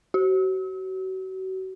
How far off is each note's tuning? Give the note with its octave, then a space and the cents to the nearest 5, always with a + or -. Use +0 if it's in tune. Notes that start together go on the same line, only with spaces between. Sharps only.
F#4 +35